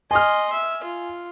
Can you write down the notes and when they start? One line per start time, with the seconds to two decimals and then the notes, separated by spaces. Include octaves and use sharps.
0.11 D#5 G#5 C6 F6
0.52 E5
0.84 F4